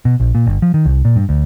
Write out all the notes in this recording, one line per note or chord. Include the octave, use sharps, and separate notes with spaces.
B2
A#1
A#2
G1
F3
D#3
C2
A#2
G2
D2